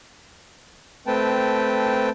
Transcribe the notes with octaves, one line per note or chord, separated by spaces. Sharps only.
A3 C4 B4 G5 A5